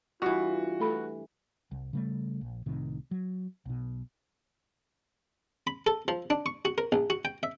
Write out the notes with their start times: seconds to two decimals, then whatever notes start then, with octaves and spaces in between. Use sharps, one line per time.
0.22 G2 E3 F4 F#4
0.80 A3 A4 B5
1.71 C2
1.93 C#3 G3 A3
2.41 A#1
2.66 C2 A2 C3 D#3
3.11 F#3
3.66 B1 B2
5.67 B5
5.87 A4
6.08 F3
6.30 D4
6.46 C#6
6.65 F#4
6.78 A#4
6.92 A#1
7.10 F#4
7.25 G5
7.43 E5